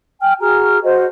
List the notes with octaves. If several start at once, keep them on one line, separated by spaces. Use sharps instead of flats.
G5 G#5 F6
F#4 G#4 A#5 F6
F#4 C5 D#5